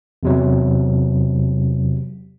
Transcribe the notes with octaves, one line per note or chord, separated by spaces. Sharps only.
E2 C3 F#3